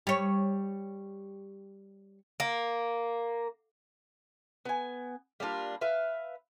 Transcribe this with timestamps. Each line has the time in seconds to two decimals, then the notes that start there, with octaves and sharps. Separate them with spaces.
0.07 G3 C#5
2.40 A#3
4.65 B3 G#5
5.40 G3 A#3 D4 F4
5.81 B4 E5 F5